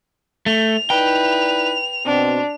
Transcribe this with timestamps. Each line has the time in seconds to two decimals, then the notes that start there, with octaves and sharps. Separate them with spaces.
0.46 A3 F7
0.90 D#4 E4 B4 D5 G5
2.06 B2 C4 D4